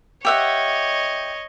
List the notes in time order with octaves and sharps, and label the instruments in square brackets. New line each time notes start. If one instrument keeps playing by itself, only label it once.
[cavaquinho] G4 E5 F#5 [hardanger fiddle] C#5 D#5